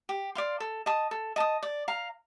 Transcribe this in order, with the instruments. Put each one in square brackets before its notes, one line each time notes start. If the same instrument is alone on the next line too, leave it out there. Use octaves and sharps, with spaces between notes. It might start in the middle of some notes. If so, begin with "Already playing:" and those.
[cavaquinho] G4
D5 F5 C6
A4
D#5 A5 D#6
A4
D#5 A5 D#6
D5
F5 A#5